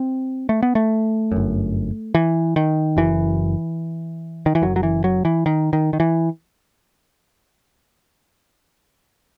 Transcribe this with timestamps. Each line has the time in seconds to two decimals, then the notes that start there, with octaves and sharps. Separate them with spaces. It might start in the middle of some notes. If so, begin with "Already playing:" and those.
Already playing: C4
0.49 A3
0.63 B3
0.75 A3
1.32 G1 F#2
2.15 E3
2.56 D#3
2.97 F#1 F#2 E3
4.46 D#3
4.55 E3
4.62 F#1 F#2 F#3
4.76 F#3
4.83 E3
5.04 F#3
5.25 E3
5.46 D#3
5.73 D#3
5.93 D#3
6.00 E3